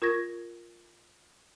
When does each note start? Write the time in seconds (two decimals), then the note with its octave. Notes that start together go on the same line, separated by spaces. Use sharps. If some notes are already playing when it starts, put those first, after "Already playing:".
0.02 F4 A#4 C#6 G#6 A#6